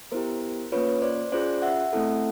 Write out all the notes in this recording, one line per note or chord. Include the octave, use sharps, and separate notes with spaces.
B3 E4 G4 A#4 C5
A#3 C#4 F4 B4 C#5
C5 D5
C#4 F4 G#4 C5 D5
E5 F#5
A3 C4 E4 A4